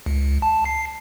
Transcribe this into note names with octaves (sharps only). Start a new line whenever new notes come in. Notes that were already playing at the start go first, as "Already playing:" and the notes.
C#2
A5
C7